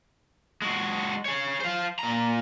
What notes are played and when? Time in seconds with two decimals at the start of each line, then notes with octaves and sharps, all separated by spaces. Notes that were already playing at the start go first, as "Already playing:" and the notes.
0.62 G#3 F#4
1.25 G#4 C#5
1.60 C5 F5
1.99 A#2 A#5